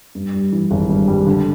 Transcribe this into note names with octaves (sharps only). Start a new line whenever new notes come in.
G2
G3
E3
G#1
G2
G3
D3